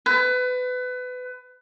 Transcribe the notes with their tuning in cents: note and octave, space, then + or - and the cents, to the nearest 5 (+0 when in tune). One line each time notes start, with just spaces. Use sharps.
B4 +25